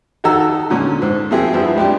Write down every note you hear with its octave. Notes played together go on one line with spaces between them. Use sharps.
D#3 D#4 F#4 A4 A#5 E6
A#2 D3 G#3 C#4
G#2
B2 F3 A#3 C4 E4 G#4
G2 F3 B3 E4
G3 G#3 D4 G4